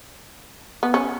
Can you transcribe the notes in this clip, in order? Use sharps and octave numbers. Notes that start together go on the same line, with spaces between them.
B3
C#4